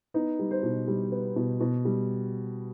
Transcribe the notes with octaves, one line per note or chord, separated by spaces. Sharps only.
B3 D#4
G3
C5
B2
G3
B3
B2
B2
G3